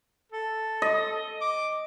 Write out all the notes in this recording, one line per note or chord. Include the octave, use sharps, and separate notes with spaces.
A4
D#5
D6